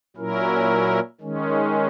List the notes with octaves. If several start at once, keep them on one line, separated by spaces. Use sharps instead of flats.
A#2 F#3 C#4 E4 A#4
D#3 G#3 C#4